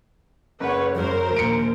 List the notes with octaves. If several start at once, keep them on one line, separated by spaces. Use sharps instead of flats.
F#1 B4 C#5 F#5
F#2 A#4 C5
A#1 D#2 C#7 D7